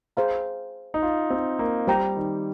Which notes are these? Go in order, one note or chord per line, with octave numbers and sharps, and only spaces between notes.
G#4 C5 F5 A#5
D#4
F4
C4
A#3
G3 C5 G5 A#5
D#3